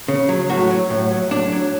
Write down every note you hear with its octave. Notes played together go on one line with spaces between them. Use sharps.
C#3
F#3
A2 F#4
F#3
A2
F#3
A2 D4
F#3